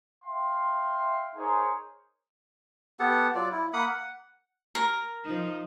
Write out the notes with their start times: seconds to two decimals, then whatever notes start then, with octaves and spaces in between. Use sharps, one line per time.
0.24 E5 F5 G5 C6
1.36 D#4 G#4 A#4 C5 C#5 G#5
3.00 B3 G4 A4 F#5
3.35 F#3 F4 D5
3.52 E4
3.73 A#3 F#5 B5 D#6
3.86 F#5
4.75 A#4
5.24 F3 D#4